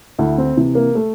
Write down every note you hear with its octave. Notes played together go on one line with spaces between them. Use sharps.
D2 E4
C4
C3 E3
A#3
A3